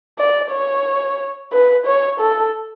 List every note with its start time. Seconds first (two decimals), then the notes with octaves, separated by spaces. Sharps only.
0.18 D5
0.52 C#5
1.52 B4
1.85 C#5
2.19 A4